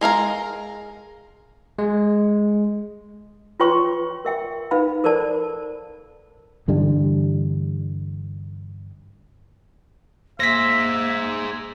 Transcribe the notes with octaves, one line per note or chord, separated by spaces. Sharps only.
G#3 A#4 F5 A#5
G#3
F4 B4 C#5 G5 C6 C#6
A#4 E5 G5
D#4 B4 F5 B5
A4 A#4 C5 D5 A5
G2 D3 E3 G3
A#3 G#4 C5 E5 A#6 B6